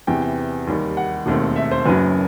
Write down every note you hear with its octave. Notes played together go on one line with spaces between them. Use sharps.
E2 C3 E3 G5
G5
D#2 D#3 G3
F#5
E1 D#2 D#3 A3 C4
E5
C5
F#1 F#2 F#3 B4